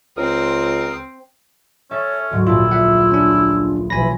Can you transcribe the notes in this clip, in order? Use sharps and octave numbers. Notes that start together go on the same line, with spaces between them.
C#2 C4 A#4 C5 D#6
C#4 A4 C#5 E5 A6
D2 G#2 F#3 F#4
A#1 E4 F4 A5
F4 E5 F#5
C#4 D4
B1 E3 F3 C#4 G#5 B5 A#6